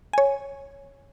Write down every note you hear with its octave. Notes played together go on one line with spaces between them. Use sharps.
C#5 G#5